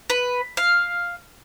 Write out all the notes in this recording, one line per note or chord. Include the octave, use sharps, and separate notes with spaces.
B4
F5